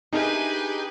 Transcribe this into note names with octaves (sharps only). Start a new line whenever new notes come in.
D4 D#4 G4 G#4 A#4 B4 E5 G#5